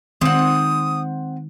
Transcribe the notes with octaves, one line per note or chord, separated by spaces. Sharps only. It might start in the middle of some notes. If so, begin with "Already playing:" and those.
D#3 G#3 C4 F#5 D#6